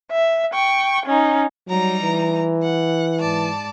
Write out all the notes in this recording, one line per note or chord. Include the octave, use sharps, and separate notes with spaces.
E5
G5 C#6
C#4 D#4
F#3 G3 D#4 A#5
E3
F#5
G#2 D5 A5